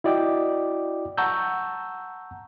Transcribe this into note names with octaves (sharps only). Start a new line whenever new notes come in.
E4 F#4 D5 D#5 G5 D6
F#5 A5 A#5 C#6 E6 G6